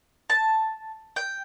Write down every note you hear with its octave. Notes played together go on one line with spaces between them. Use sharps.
A5
G5